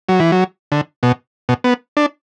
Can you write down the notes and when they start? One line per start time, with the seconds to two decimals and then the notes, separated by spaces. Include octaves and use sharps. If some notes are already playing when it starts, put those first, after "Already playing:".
0.09 F#3
0.20 E3
0.32 F#3
0.72 D3
1.03 B2
1.49 B2
1.64 B3
1.97 D4